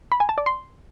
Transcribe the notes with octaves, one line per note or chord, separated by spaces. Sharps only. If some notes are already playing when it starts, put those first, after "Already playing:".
B5
G#5
A5
D5
C6